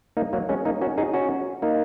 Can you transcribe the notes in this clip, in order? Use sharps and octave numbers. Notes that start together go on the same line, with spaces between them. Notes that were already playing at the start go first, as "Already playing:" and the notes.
A#3 D#4
F#3 A#3
G#3 C#4
A#3 D#4
C#4 F#4
D#4 G#4
C#4 F#4
A#3 D#4